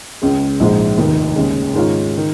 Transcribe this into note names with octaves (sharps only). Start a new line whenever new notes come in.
C#2 C#3 G#3
A#1 G#2 F3 G#3
F1 D#2 D#3
D#2 C#3 G#3
G#2 D#3 G#3 C#4 F4
D#3